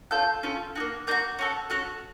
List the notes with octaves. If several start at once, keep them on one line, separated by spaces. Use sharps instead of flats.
C#4 F4 A4 G6
C#4 F4 A4
A#3 D#4 F#4
A#3 D#4 F#4 G6
C#4 F#4 A4
C#4 F#4 A4 F#6